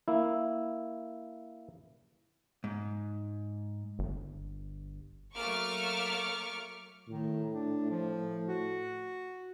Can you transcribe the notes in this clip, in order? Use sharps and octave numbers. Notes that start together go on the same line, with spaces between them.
A#3 E4
G#2
G1
F#3 A3 A#3 C#6 D6 F6
A2 D#3
D4
F3
F#4